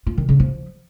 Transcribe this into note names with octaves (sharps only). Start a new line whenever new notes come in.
F4
D#3
C#3
F3